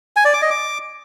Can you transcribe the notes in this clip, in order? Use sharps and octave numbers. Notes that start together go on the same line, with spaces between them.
G#5
D5
D6
D#5
D6